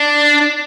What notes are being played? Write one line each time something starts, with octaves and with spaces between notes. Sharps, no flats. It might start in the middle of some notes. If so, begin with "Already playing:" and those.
Already playing: D4